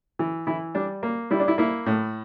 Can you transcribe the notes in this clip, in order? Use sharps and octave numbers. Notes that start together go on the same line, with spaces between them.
E3
E3 E4
G3 D4
A#3
G3 E4
D4
E4
A#3 E4
A2